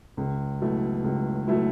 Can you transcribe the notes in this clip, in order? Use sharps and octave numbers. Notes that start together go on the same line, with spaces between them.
C#2
B2 F#3 A3 E4
C#2
B2 F#3 A3 E4